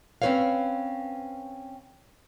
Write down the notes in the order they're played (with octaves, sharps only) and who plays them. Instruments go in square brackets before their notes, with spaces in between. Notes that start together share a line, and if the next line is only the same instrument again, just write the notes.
[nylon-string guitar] C4 C#4 F#4 B4 C#5 F5